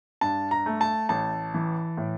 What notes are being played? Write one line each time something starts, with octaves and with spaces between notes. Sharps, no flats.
G2 A5
A#5
A3
A5
A1 A5
E3
A2